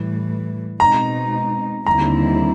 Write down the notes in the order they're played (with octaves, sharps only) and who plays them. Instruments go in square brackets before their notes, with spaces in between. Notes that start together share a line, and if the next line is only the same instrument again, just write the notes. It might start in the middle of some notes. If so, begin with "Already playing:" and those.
Already playing: [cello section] A2 E3 G3
[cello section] B2 G#3 C4 D#4 [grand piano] A#5
[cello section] D#2 D3 G3 C4 E4 [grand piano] A#5